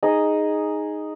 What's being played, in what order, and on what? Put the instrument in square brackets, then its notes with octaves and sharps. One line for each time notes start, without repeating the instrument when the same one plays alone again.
[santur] D#4 G#4 D#5